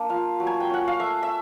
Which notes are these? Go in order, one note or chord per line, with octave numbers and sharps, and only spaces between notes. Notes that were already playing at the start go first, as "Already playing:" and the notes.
Already playing: A#3 D4
F4 F5
F#3
G#5
G5
C#4 F#5
F5
A3 E5
E5